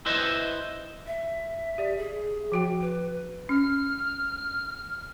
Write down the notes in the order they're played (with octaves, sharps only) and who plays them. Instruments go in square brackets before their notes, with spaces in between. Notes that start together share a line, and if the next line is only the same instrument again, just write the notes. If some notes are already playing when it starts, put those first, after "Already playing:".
[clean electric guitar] E4 B4 C5 D#5 E5
[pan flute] E5
[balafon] G4 D5
[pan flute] G#4
[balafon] F3 F#4 G5
[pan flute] B4
[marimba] C#4 [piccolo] F6